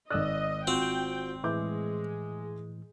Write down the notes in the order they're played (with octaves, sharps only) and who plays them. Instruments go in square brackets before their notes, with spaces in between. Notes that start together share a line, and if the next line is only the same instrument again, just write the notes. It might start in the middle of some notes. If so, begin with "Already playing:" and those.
[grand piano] G#1 F#6 [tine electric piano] D5 D#6 E6 [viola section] D#5
[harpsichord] C4 [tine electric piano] F4 F#4 C5 [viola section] G5
[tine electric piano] A2 E3 [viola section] G#3 [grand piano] E5 D6 G6